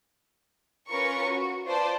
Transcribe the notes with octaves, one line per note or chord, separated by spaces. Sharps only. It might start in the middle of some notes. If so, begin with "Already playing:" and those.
C#4 F4 A#4 B4 C#6 C#7
F#4
F4 B4 C5 D5 A5